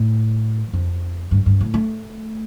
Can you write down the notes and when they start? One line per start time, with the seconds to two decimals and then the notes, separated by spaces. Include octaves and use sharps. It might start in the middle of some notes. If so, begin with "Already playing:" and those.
Already playing: A2
0.73 F2
1.31 G2
1.46 G2
1.61 A2
1.74 A3